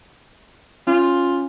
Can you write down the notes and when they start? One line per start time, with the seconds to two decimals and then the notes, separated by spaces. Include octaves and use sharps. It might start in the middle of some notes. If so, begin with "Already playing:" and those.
0.87 C#4 F4